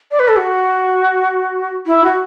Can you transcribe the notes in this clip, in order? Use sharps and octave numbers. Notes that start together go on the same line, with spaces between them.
D5
B4
A4
F#4
E4
F#4